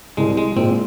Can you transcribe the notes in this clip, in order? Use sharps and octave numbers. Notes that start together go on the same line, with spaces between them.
C2 G#3
G#3
A#2 G#3 C4